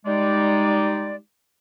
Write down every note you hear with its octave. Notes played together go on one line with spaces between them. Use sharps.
G3 G#3 D#4 D5